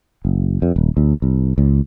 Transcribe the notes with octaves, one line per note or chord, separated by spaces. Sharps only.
F#1
F2
D#1
D2
C2
C#2